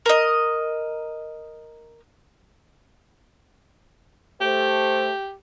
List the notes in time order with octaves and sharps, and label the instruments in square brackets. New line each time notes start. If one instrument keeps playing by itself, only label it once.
[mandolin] A#4 D#5
[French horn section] A3 C5 [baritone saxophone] G4